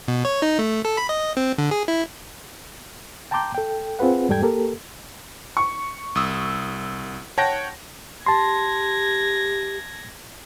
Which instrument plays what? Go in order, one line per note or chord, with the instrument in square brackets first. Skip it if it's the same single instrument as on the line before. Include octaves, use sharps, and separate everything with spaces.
[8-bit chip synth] B2
C#5
D#4
A3
A4
B5
D#5
C4
D3
G#4
E4
[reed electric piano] G5 A5 A#5 C6 D6 G6
A4 G5
C4 F4 G#4 B4 F#5
E2 G#2 G3 A4 G5 G#6
A#3 G4 A4 A#4
[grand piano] C#6
[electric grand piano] C2 D#6 E6
[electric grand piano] C#5 F#5 G5 [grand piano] A5 A#6
[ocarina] G4 [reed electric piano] A5 C6 [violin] G#6 A#6